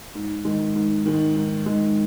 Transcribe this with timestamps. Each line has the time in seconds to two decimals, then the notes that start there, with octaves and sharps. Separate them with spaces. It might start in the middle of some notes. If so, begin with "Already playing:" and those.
0.15 G#2
0.45 D#3 G#3
0.75 G#2
1.06 D#3 G#3
1.36 G#2
1.66 D#3 G#3